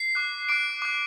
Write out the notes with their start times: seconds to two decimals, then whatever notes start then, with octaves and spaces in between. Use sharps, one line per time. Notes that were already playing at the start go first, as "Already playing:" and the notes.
Already playing: C7
0.15 D6 F#6
0.49 D6 F#6 D7
0.82 D6 F#6